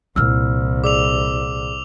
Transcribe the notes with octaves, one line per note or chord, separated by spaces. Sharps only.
C2 A#2 E3 E6 F6
G#4 D5 D6 E6 F7